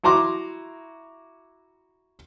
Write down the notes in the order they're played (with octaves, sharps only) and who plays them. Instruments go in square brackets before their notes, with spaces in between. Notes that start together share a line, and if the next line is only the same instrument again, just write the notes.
[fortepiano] E4 F#4 A#5 C6 D6